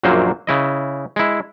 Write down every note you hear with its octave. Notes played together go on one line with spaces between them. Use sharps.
A#1 F#2 A#2 F#3 A#3 C5
C#3 E4 D#5
G#3 E4